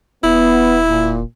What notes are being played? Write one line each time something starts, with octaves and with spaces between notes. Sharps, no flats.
E1 B3 E4
A#2